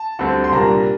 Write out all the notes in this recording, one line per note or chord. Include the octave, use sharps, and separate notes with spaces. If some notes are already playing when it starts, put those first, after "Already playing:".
Already playing: A5
D2 D3 G3 C4
C6
C2 A#2 G3 A#3 D4 A#5